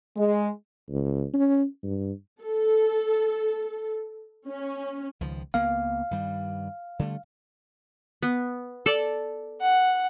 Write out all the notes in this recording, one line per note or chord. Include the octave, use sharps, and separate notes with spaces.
G#3
C#2
C#4
G2
A4
C#4
C#2 D#3 F3
C#2 A#3 B3 F5
G2 D#3 G3
D3 G3 A3
B3
A4 D5
F#5